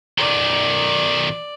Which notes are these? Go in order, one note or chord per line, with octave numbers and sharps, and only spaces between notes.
B1 D#3 D5